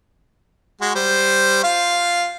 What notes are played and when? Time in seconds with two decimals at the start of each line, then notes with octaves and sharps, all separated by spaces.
0.81 G#3 F#4
0.95 G3 C5
1.64 F4 F5